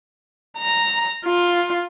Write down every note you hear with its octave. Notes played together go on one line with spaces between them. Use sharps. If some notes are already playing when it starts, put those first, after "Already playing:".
A#5
F4